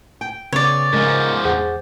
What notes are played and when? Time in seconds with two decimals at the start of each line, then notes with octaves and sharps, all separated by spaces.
0.21 G5
0.53 C#3 B3 G#4 C#5 D5
0.93 G#2 F3 G#3 A#4
1.45 E2 G#4 C5 F#5